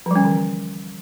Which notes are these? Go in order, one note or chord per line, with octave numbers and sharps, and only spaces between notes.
D3 E3 F3 G3 C#4